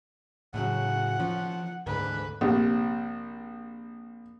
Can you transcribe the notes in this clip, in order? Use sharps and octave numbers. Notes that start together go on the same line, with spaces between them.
A2 C#3 F#3 F#5
F3 C#4
D2 G#2 D3 B4
A#1 C3